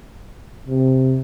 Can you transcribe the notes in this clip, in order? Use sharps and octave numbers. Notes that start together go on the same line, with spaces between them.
C3